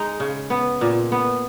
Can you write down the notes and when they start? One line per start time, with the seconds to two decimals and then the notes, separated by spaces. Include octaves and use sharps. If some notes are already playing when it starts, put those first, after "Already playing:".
Already playing: G#3 D#4
0.20 C#3
0.50 B3
0.81 A#2
1.12 B3